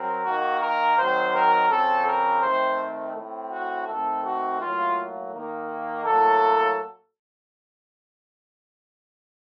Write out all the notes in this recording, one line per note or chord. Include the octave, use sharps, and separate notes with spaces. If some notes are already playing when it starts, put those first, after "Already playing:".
Already playing: F#3 C4 A#4
D#3 A#3 F#4
A#4
D#3 F#3 C4 C5
A#4
C#3 F3 C4 A4
A#4
D#3 A3 C4 C5
A2 A3 C4
F#4
D#3 A3 C4 A4
F#4
A2 F#3 A#3 F4
D#3 A#3
A2 F#3 A#3 A4